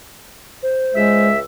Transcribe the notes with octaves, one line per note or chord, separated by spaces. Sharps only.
C5
C#2 G#3 E5